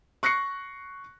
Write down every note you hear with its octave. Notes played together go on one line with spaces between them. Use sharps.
C#6 F#6 A#6 C7 C#7